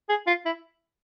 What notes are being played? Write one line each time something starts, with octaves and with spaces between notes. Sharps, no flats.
G#4
F4
E4